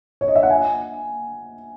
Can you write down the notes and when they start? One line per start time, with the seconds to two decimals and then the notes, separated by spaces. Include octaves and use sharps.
0.21 C#5
0.28 D#5
0.36 E5
0.43 F#5
0.50 G#5